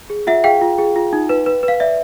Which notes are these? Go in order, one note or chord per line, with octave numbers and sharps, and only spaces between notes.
G#4
F4 E5 F#5
G#4 F5 G5
F4
G#4
F4
D#4
B4
B4
B4
F5
D5 E5